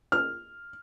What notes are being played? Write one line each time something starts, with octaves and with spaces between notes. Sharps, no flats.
F6